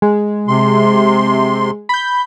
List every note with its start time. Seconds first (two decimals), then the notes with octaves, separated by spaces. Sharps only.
0.02 G#3
0.48 C3 C6
1.89 B5 G6